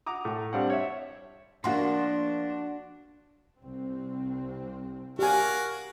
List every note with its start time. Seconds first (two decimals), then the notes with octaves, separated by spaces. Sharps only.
0.06 F#5 A#5 D6 D#6
0.25 A2
0.53 G3 C4 D4 F5 F#5
0.70 C#5 E5
1.64 F3 A#3 D4 F#4 F#5 C6
3.57 C2 C4
5.19 F#4 G4 A#4 F5 G#5